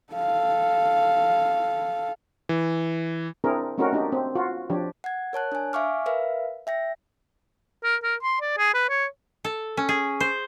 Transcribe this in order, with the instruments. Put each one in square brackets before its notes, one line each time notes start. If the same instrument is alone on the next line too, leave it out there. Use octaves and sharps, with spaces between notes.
[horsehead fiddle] A4 F5
[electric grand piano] E3
[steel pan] C4 D4 E4 G#4 A#4
A3 C4 C#4 D#4 F#4 A#4
A#3 D4 D#4 G4
C4
F4 F#4
F3 D4 G4 C#5
[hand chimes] F#5 G#6
A#4 C#5 A5 F#6
D4 G#5
E5 F5 G#5 C#6 D6 F6
A#4 B4 E5 F5
E5 G5 A#6
[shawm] A#4
A#4
C6
D5
G#4
B4
C#5
[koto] A4
C#4
G#4
C5